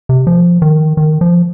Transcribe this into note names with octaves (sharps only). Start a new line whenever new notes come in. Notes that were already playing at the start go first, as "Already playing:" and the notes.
C3
F3
D#3
D#3
F3